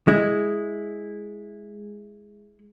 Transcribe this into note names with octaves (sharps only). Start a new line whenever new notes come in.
G#3 E4